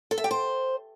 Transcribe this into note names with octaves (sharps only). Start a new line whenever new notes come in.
A4
E5
G4
C5